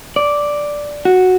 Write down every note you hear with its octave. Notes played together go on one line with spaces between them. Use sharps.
D5
F#4